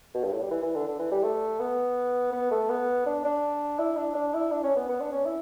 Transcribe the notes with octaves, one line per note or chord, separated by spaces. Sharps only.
B2
G2
A2
G3
E3
E3
D3
D3
E3
G3
A3
B3
B3
A3
B3
D4
D4
E4
D4
D4
E4
D4
C#4
B3
B3
D4
C#4
E4